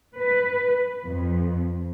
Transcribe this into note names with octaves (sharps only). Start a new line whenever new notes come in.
B4
F2